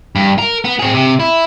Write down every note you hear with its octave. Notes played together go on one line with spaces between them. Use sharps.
G2
A#4
B3
C4 G#4
C3
E4